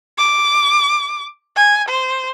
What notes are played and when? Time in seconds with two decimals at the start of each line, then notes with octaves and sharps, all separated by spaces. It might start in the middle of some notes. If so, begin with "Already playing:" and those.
0.18 D6
1.56 G#5
1.88 C5